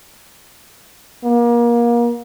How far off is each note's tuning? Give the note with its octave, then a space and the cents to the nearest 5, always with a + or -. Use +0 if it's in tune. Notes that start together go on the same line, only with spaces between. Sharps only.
A#3 +30